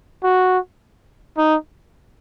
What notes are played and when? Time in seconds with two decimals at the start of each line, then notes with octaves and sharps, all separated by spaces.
0.23 F#4
1.38 D#4